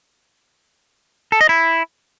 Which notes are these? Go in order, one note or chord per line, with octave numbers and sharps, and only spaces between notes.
A4
D#5
E4